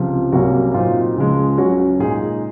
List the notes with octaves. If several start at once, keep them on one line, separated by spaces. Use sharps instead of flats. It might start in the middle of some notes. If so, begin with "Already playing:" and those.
Already playing: C#2 C3 F3 C4
C2 C3 F#3 A#3 C#4 F#4
A#2 F#3 C4 D#4 F4
C#2 C#3 F3 G#3
C#2 C#3 F#3 C#4 F#4
A#2 G#3 D#4 G#4